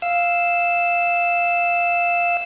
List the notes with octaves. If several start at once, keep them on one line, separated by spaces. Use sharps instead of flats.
F5 E6